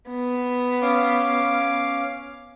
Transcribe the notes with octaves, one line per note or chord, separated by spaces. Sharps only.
B3
C#4 F5 D6